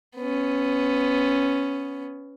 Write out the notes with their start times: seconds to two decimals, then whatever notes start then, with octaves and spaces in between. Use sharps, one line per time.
0.17 B3 C#4